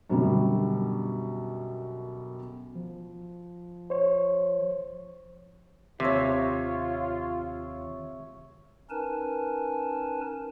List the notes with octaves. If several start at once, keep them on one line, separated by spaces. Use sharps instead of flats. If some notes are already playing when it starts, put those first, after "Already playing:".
F#2 B2 D3 D#3 G3
F3
C5 C#5
D#2 C3 F4 C#5 E5
C#4 D#4 A#4 B4 G#5 A5